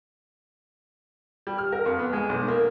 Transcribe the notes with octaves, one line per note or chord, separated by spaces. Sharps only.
G3
F6
A#4
F2
B3
G#3
B1
A#3